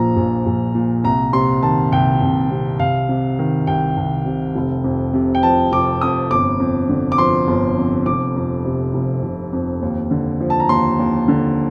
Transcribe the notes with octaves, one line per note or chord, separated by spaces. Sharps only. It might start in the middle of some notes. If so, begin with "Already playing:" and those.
Already playing: A#1 A#2 F3 A#5
A#1
A#1
A#2
C2 A#5
C3 C6
D#3 A5
C2 G5
C2
C3
C2 F5
C3
D#3
C2 G5
C2
C3
F1
F2
C3
G5
F3 A5
F1 D6
F2 D#6
G1 D6
F2
D3
D6
F3 C6
G1
F2
F1 D6
F2
C3
F1
F1
F2
D#2
D3
F3
A5
A#5
D#2 C6
D#2
D3